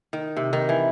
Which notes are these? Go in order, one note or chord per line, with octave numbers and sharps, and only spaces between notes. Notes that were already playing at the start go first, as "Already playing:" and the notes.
D#3
C3
D#3
E3